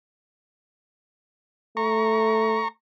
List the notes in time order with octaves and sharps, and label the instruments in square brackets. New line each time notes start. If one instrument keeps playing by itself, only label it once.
[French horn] A3 [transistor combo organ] A#5 C#6